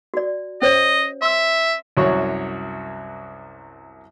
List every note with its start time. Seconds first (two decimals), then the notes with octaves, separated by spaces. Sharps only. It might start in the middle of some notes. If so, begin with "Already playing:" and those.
0.14 F#4 D5
0.62 C#4 C5 C#5 D#5
1.22 E5 C6 E6
1.97 C2 F#2 F#4 C#5 C#6